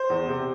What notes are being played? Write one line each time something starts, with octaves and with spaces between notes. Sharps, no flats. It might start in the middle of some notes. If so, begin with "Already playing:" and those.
Already playing: C5
E2
C3